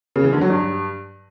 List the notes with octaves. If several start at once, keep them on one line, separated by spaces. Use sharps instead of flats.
C#3
E3
D3
F#3
G2